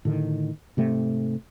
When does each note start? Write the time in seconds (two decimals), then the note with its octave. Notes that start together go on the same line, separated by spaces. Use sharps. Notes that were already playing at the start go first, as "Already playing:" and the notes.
0.05 A2 D3 D#3
0.77 G#2 C3 A3